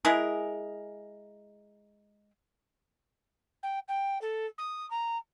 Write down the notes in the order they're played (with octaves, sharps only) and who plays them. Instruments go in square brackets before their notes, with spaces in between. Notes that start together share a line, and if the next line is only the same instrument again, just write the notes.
[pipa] G#3 E4 G#4 A#4
[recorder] G5
G5
A4
D#6
A#5